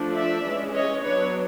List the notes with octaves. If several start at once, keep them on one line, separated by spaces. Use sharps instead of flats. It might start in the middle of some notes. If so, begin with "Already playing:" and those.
Already playing: F3 A3 D4
D5 E5
E3 G#3 C#4
C#5 D#5
F#3 B3 D4 B4 C#5